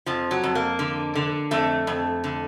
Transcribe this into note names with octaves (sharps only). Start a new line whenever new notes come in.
F2 F3
F#3
F2
A#3
D3
D3
F2 A3
F2
D3